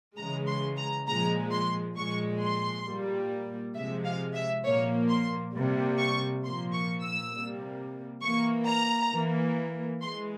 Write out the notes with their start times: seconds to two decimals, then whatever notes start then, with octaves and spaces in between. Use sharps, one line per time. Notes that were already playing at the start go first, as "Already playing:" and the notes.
0.17 C#3 E3 G#3 A#5
0.48 C6
0.77 A#5
1.07 A#2 F3 G#3 A#5
1.52 C6
1.96 A#2 F3 G#3 C#6
2.41 C6
2.86 A#2 G3 A#3
3.75 C3 F3 G#3 E5
4.05 F5
4.34 E5
4.64 A#2 F3 A#3 C#5
5.09 C6
5.54 C3 G3 A#3
5.99 C#6
6.44 A#2 F3 A#3 C6
6.73 C#6
7.02 E6
7.33 C3 G3 A#3
8.22 E3 A#3 C#6
8.67 A#5
9.11 E3 A#3
10.01 E3 G#3 C6